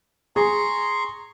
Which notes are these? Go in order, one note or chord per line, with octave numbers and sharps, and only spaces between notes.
G#4 A#5 C6 C#6